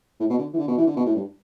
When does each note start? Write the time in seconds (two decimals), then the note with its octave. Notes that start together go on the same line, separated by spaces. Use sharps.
0.20 A2
0.29 B2
0.39 D3
0.53 E3
0.58 D3
0.68 B2
0.77 E3
0.87 D3
0.96 B2
1.06 A2
1.15 G2